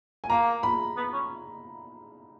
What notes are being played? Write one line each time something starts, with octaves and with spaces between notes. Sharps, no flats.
G#5
A#3 A#5
B5
B3
C#4